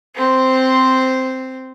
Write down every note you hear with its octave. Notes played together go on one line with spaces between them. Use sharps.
C4 C5